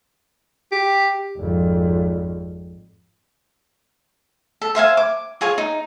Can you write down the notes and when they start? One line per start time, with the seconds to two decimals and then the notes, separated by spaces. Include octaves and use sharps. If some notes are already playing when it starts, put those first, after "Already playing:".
0.72 G4
1.37 G#1 F2
4.61 A4
4.75 C5 E5 F5 G#5
4.97 D6
5.41 F4 G#4 C#5
5.58 D#4